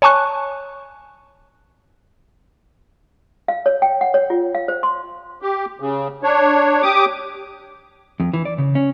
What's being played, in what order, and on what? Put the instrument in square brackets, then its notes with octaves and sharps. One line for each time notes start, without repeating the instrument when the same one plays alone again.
[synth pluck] C#5 G#5 A5 C#6 F#6
[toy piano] F5
C#5
G5
F#5
C#5
F4
F5
C5
C6
[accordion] G4
C#3
D4 C#5
G4 D6 D#6
[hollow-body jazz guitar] F2
E3
D5
C#3
C#4